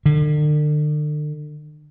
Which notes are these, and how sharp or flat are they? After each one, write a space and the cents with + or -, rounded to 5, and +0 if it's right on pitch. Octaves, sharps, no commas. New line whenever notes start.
D3 +40